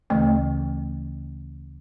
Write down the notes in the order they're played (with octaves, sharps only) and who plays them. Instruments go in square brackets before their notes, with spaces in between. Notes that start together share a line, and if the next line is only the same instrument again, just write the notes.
[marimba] D2 C#3 E3 A3